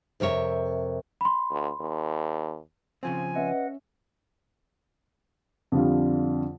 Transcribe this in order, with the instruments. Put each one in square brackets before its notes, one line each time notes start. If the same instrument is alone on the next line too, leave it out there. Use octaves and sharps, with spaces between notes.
[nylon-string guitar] F2 C3 A#4 C#5 E5
[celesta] B5 C6
[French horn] D2
D#2
[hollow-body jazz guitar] C#3 F3 C4 [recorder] G#5
[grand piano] C#4 E5 [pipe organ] B4 D#5 F#5
[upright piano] F2 D3 G3 F4